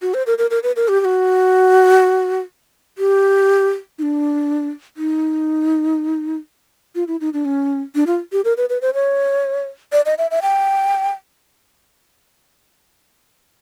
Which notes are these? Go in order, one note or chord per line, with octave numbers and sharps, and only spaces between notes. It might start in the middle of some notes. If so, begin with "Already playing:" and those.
F#4
C5
A#4
A#4
A#4
B4
A#4
G4
G4
F#4
G4
D#4
D4
D#4
F4
E4
D#4
D4
C#4
D4
F4
G4
A#4
B4
B4
C5
C#5
D5
D#5
E5
E5
G5